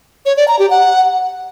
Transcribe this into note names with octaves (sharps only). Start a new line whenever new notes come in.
C#5
D5
A#5
G4
F#5